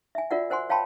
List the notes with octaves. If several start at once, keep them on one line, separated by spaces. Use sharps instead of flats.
E5 G#5
F4 F#4 A#4 D5 E5 F#5
A#4 C5 F#5 G#5 C6
C#5 F5 G5 A5 B5 C6